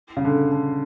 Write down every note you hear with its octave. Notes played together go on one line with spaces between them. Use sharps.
C#3
D3
D3